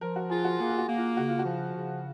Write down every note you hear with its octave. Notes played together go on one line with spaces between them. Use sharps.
F3 A#4
F#4
F4 G#4
F#4
A#3 G#4
G#4
F#4
A#3
F4
C#3 F#4
F4
F#4
F3
C#3